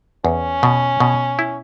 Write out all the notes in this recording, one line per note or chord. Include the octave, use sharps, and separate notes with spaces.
E2 C#4
B2
B2
E4